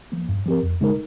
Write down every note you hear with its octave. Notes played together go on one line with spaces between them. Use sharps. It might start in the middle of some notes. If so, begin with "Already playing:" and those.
F3 A#3
G2
F3 C4 G4 A#4
F2
C#3 G#3 D#4 A#4